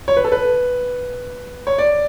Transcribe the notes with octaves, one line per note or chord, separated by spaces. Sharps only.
C#5
B4
A4
B4
C#5
D5